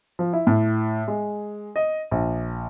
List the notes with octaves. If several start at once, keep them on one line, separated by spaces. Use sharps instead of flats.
F3
E4
A2
G#3
D#5
A#1